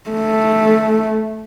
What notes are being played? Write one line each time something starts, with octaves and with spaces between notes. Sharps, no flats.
A3